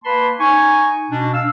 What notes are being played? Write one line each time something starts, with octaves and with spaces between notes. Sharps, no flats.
A#3 B4 A5 B5 C6
D#4 G#5 C#6
B2 D4
F5 E6